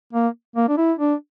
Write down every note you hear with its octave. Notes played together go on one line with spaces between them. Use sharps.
A#3
A#3
D4
E4
D4